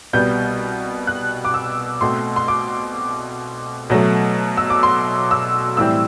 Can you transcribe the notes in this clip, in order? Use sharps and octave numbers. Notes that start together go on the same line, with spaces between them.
C2 B2 G3 B3 G6
F#6
D6
E6
B2 A3 C4 C6
C6
D6
B2 F#3 A3
E6
D6
C6
E6
A2 E3 G3 C4 E6